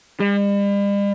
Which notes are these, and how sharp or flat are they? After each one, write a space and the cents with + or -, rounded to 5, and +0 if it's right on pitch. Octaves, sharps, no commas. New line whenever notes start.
G3 +45